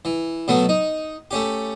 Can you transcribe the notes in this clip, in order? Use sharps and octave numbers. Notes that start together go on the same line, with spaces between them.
E3
B2 F#3 A3 B3
D#4
A3 C#4 G4